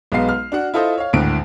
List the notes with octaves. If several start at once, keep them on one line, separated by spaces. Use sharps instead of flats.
B1 G#3 B3 F5 C7
F6
D4 F#4 F#5
E4 F4 A4 C5 D#5
C#5 F5
G#1 D2 A2 D3 D7